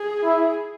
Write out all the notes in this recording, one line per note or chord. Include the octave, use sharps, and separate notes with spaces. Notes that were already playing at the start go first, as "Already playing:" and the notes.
Already playing: G#4
E4